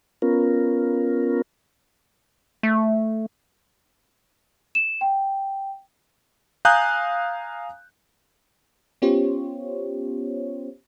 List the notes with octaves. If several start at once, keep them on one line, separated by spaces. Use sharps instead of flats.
B3 C#4 F4 A#4
A3
E7
G5
F5 G#5 A#5 D#6 F#6 G6
B3 C#4 F4 G4 C5 C#5